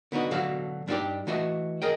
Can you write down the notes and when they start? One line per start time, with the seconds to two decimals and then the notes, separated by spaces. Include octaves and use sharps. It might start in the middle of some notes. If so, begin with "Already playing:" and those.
0.12 D3 B3 D#4 F#4
0.31 B2 D3 F#3 F#4 A4 F5
0.88 G2 D4 D#4 F4 G4 D5
1.27 E3 A3 F#4 D#5 E5
1.82 G#4 A#4 D#5 G5